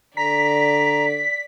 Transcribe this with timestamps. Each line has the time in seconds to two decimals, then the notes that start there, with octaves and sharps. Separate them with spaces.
0.17 D3 D5 A#5 B6